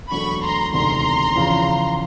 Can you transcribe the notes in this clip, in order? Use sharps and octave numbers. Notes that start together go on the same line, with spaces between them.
E1 D2 D3 F#3 A3 B5 C#6
A#5 C6
E1 D2 C3 D#3 A#5 C6
E2 C#3 F3